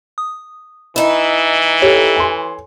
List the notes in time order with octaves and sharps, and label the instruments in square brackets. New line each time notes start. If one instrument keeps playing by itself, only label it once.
[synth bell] D#6
[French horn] E3 [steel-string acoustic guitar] D#4 E4
[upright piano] G4 [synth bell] A4 C#5
[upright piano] G#5 C6